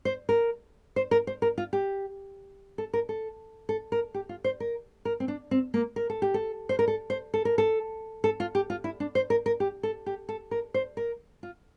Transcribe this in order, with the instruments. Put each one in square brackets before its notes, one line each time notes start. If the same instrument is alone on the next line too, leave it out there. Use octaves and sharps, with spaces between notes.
[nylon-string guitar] C5
A#4
C5
A#4
C5
A#4
F4
G4
A4
A#4
A4
A4
A#4
G4
F4
C5
A#4
A#4
C4
D4
C4
A#3
A#4
A4
G4
A4
C5
A#4
A4
C5
A4
A#4
A4
A4
F4
G4
F4
E4
D4
C5
A#4
A#4
G4
A4
G4
A4
A#4
C5
A#4
F4